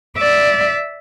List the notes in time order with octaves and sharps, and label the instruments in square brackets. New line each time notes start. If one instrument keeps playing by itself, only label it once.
[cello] D5 E5